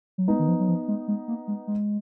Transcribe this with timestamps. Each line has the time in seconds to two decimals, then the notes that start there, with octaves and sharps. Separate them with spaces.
0.18 F#3
0.28 G#3 B3 D#4
0.39 D#3
0.48 F3
0.60 F#3
0.68 F3
0.88 G#3
1.08 G#3
1.28 A#3
1.48 G#3
1.68 G#3